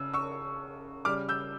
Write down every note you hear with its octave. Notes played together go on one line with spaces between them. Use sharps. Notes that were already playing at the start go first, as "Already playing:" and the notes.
Already playing: C#3 E6
C#6 E6
C#3 G3 D6 F6
E6 G6